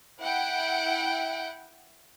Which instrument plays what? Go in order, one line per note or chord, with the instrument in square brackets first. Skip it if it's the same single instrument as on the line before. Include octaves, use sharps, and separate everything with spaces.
[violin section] E4 F#5 G5